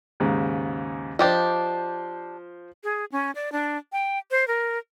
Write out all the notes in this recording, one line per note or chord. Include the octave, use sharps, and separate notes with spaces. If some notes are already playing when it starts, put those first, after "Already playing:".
D#2 G#2 C#3
F3 D4 G4 C5 D#5
G#4
C#4
D5
D4
G5
C5
A#4